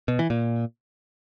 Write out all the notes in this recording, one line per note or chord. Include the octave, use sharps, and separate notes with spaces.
B2
E3
A#2